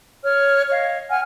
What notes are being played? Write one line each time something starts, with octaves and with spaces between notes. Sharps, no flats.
C#5 F6
C#5 D#5 F5
F#5 G#5 F6